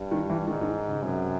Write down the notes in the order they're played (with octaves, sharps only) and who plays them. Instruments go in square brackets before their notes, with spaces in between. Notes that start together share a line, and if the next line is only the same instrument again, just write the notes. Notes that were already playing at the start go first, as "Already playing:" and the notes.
Already playing: [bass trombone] G2
[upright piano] D#3
E3
[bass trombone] G#2 [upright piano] D#3
[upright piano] D#3
C#3
[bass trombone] F#2 [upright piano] C3